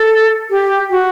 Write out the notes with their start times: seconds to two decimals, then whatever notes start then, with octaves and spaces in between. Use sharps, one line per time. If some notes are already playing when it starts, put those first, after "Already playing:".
Already playing: A4
0.50 G4
0.90 F#4